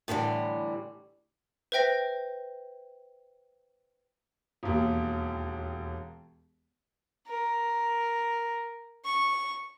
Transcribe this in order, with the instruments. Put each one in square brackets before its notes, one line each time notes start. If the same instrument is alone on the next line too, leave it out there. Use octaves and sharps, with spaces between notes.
[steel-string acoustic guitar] A2 D3 E3 G3
[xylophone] B4 C5 E5 G5 A#6 B6
[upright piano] E1 D#2
[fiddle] A#4
C#6